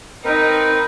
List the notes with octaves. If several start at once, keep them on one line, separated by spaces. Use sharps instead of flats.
C4 D#4 A#4 B4